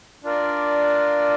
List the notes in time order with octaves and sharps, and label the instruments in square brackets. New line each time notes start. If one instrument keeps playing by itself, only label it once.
[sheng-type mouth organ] D4 F4 A#4 D5